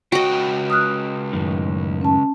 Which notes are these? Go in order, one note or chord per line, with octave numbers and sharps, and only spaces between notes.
C#2 F#4 D#5 G5
D#6 F6 F#6
F#2 A2 D#3
C#4 A5